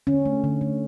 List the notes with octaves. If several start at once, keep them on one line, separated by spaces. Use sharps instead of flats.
D3 C#4
A3
D3
A3